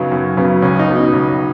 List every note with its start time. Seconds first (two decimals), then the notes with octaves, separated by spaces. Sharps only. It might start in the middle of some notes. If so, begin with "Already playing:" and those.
Already playing: F#2 C#3 F#3 B3 D#4
0.12 F#2
0.37 C#3 F#3 B3
0.62 C#2 C#4
0.79 D#4
0.88 B2 F#3 B3
0.96 D#4
1.13 C#2